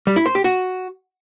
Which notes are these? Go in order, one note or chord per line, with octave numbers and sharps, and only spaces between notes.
G3
E4
C5
G4
F#4